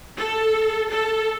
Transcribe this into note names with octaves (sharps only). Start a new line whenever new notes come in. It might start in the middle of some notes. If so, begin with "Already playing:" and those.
A4
A4